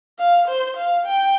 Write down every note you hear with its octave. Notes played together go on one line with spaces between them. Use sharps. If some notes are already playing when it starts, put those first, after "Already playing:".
F5
C5
F5
G5